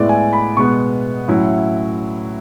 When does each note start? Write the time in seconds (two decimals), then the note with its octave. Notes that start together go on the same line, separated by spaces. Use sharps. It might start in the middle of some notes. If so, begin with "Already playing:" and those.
Already playing: A2 G#3 B3 E4 D5
0.09 G#5
0.33 B5
0.57 B2 G#3 B3 C#6
1.28 A2 F#3 C#4 E4